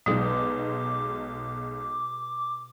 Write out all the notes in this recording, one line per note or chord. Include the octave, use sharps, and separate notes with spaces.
B1 B2 F#3 G#3 D#4 G5 D6